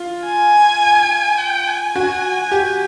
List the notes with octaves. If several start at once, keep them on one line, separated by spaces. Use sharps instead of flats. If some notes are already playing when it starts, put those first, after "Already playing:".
Already playing: F4
G#5
G5
G#5
F#4
G4